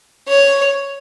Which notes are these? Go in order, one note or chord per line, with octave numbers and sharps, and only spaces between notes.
C#5